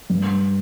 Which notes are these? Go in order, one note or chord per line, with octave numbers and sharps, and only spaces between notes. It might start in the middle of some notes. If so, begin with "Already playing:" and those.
G2